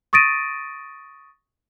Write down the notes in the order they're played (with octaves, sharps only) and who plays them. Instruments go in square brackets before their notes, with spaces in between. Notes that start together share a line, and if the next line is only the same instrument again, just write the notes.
[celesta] C#6 D#6 A6 A#6 D7 D#7